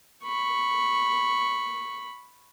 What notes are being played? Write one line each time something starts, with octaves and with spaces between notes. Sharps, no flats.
B5 C#6